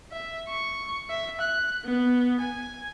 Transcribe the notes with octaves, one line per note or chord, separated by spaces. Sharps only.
E5
C#6
E5
F#6
B3
G#5